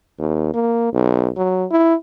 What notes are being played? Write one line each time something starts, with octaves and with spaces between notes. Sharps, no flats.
D#2
A#3
B1
F#3
E4